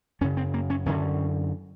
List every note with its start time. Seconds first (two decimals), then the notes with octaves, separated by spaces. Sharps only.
0.21 F#2 C#4
0.24 C#3
0.37 C4
0.54 A#3
0.70 C#4
0.86 F#2 D3 C#4